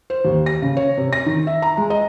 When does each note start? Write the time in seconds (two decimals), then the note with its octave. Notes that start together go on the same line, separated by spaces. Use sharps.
0.10 C5
0.25 D#2
0.46 A#6
0.62 C#3
0.77 C#5
0.97 C3
1.13 A#6
1.26 D#3
1.47 E5
1.62 A#5
1.77 G#3
1.90 D#5